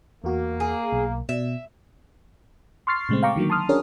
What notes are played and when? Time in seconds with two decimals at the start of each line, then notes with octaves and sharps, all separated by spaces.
0.24 E2 A#3 F#4
0.60 G#4
0.92 B1
1.29 B2 E5
2.87 C6 C#6 F6 A6 C7
3.09 A#2 C#3 G#3 A3 C4
3.23 F5 G5 A#5 C#6 D6
3.36 D3 D#3 F#3 A#3
3.50 A5 C6 D#6 F6
3.69 C#4 D4 F#4 G#4 A#4 C#5